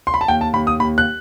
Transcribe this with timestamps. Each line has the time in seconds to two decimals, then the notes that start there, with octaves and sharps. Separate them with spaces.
0.07 C6
0.14 B5
0.21 A5
0.28 D#2 G5
0.41 A5
0.53 D#2 B5
0.67 D#6
0.79 D#2 B5
0.98 F#6